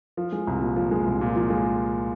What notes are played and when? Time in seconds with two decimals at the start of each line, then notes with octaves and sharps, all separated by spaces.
0.17 F3
0.32 G#3
0.47 C2
0.61 A#2
0.76 F3
0.91 G#3
1.06 C2
1.21 A#2
1.36 F3
1.50 G#3